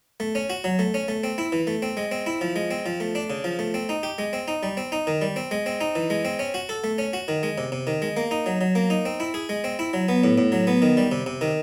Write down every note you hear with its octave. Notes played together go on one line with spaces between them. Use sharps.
A3
C#4
F#4
F#3
A3
C#4
A3
C4
E4
E3
A3
C4
G#3
C4
E4
F3
G#3
C4
F3
A3
D4
C#3
F3
A3
C4
D#4
G4
G#3
C4
D#4
G3
C4
D#4
D#3
G3
C4
G#3
C4
D#4
E3
G#3
C4
C#4
F#4
A4
A3
C#4
F#4
D#3
G#3
C3
C3
D#3
G#3
A#3
D#4
F#3
F#3
A#3
D#4
C4
E4
G#4
G#3
C4
E4
F#3
B3
A2
A2
F#3
B3
D#3
G3
C3
C3
D#3